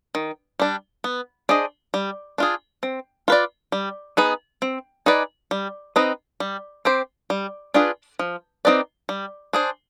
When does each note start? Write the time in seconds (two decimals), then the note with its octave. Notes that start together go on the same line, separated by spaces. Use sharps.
0.15 D#3
0.59 G3 D4
1.04 B3
1.49 D4 G#4 C5 D#5
1.94 G3
2.38 D4 F4 G#4
2.83 C4
3.28 F4 B4 D5
3.72 G3
4.17 B3 D#4 G#4 B4
4.62 C4
5.06 D#4 G#4 B4 D5
5.51 G3
5.96 C4 D#4 B4 D#5
6.40 G3
6.85 C4 G4 C5
7.30 G3
7.74 D4 F4 G#4 B4
8.19 F3
8.65 C4 D#4 B4 D5
9.09 G3
9.53 D4 G#4 C5